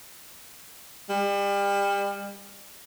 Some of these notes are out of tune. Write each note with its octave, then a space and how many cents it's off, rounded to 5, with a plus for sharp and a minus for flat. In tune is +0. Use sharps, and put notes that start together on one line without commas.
G3 +35